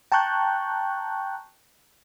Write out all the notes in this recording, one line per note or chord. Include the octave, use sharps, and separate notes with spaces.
G5 A5 A#5 C#6 F#6 G6